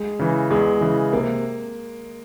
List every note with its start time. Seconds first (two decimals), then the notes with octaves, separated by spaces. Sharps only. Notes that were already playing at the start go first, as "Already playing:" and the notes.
Already playing: G#3
0.19 C#3 E3
0.50 E2 G#3
0.81 C#3 E3
1.13 C3 A#3